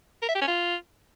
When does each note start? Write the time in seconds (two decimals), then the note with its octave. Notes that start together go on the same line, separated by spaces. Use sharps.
0.22 A#4
0.29 E5
0.35 G4
0.41 C#4
0.48 F4